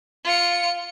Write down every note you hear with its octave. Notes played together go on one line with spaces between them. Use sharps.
F4 C#7